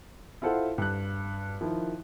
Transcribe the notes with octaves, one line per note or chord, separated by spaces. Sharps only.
E4 F4 A4 C5 F#5
G2 F#6
D#3 F3 E4